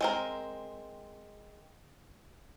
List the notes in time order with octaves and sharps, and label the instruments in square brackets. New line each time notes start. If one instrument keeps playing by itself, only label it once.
[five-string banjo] G#3 C4 A#4